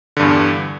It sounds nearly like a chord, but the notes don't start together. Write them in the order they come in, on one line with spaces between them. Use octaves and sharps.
D3 G2 E2